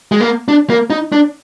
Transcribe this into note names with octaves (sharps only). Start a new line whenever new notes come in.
G#3
A#3
D4
A#3
D#4
D4